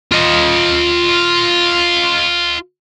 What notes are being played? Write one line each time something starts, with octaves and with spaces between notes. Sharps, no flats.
F4 D#5